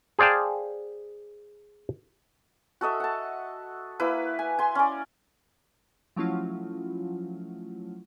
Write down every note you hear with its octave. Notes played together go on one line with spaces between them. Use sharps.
G#4 C5 D5 F5 G5 A5
F#4 A4 D#5 E5
F#5 A5
A#3 E4 B4
G#5
G#5 C6
C#4 D5
F3 F#3 A3 C#4 E4 F4